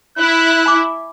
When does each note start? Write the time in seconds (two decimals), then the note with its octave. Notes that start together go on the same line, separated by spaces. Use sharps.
0.18 E4 F#6
0.66 G#5 D6